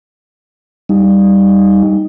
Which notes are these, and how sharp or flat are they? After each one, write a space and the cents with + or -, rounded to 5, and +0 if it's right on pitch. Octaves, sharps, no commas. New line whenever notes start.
G3 +0 D#4 +0